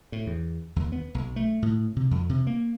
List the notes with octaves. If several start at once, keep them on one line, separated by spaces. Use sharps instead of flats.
A2
E2
D#2
B3
B1
A3
A2
C3
F2
C3
A#3